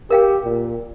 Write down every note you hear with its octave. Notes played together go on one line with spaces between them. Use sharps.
G4 A#4 F5 G5
A#2